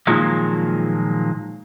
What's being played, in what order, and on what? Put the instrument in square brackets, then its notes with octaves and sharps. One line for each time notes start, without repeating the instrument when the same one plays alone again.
[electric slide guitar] A#2 D#3 F3 F#3 G#3 A#3